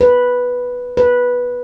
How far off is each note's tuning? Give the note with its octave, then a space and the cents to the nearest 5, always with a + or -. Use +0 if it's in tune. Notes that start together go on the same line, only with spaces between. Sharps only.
B4 -5
B4 -10